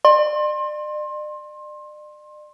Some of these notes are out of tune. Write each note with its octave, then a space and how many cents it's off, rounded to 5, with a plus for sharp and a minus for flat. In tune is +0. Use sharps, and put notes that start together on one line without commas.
D5 +40 C6 +25